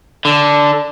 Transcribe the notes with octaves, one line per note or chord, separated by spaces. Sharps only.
D3